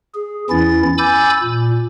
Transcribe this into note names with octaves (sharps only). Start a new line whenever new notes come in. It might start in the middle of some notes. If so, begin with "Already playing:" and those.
G#4
E2 E3 C#4 E4 A6
G#5 B5 D6 E6 G6 A6
A#2